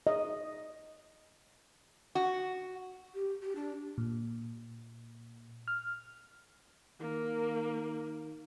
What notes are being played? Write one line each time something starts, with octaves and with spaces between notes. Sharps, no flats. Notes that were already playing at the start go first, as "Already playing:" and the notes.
D#5
F#4
G4
G4
D4
A#2
F6
D#3 A#3